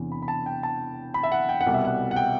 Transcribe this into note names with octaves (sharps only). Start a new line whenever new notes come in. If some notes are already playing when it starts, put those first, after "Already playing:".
Already playing: E1 E2 C3 E3
B5
B5
A5
G5
A5
B5
E5
F#5
G5
F#5
C2 B2 G3
E5
F#5
F#5
G5